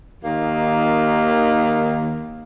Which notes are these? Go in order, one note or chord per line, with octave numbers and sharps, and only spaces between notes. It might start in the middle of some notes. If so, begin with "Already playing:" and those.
D#2 D#3 A#3